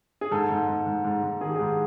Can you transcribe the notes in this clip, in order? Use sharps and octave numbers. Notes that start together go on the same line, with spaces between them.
G#4
G#2 A4
G#2
G#2
G#2
G#2
G#2
D#3 G#4
G4
G#2 G#4